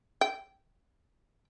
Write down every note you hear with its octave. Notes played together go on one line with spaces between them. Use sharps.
G5